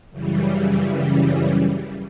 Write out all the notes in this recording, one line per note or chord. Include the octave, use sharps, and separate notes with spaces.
F#2 C#3 E3 G3